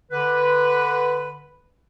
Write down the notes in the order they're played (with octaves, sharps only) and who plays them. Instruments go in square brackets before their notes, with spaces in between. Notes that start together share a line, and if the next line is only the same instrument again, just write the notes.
[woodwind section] D3 B4